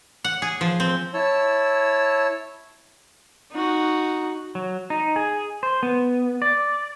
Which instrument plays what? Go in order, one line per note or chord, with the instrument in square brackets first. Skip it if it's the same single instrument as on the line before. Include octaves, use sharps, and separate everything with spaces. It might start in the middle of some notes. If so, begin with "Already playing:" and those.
[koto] F#5
G#4
F3
C4
[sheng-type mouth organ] E4 C#5 A5 E6
[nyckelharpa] D#4 F#4
[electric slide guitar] F#3
D#4
G#4
C5
B3
D5